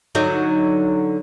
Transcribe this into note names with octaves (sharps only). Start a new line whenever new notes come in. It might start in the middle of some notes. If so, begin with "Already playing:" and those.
D3 F#3 D#4